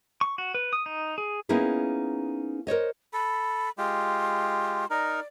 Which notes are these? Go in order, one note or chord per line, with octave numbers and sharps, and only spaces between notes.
C#6
F#4
B4
D#6
D#4
G#4
A#3 B3 C#4 D#4 E4 G#4
A#4 C5 C#5 D#5
A4 B5
G#3 F4 G4 C6
D#4 A#4 D5